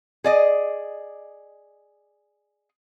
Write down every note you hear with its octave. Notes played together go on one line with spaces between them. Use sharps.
G#4 D5 D#5